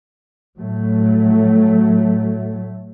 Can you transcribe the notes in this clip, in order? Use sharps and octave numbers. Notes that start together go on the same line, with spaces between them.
A2 F#3 A3